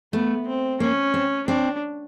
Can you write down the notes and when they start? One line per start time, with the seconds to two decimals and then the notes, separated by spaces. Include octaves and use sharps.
0.13 A3 B3
0.47 C4
0.80 A#3 C#4
1.14 C4
1.48 C4 D4